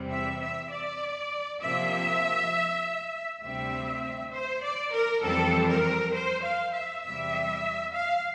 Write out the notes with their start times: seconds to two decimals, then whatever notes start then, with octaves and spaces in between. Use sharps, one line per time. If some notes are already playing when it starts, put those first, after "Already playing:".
Already playing: E2 C3 G3 C4
0.10 E5
0.41 E5
0.70 D5
1.60 C3 F3 A#3 E5
3.41 D2 C3 G3 C4 E5
4.32 C5
4.62 D5
4.92 A#4
5.22 F2 E3 G3 C4 A4
5.68 A#4
6.13 C5
6.43 F5
6.73 E5
7.03 E2 C3 G3 E5
7.94 F5